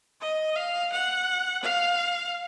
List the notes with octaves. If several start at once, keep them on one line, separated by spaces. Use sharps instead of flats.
D#5
F5
F#5
F5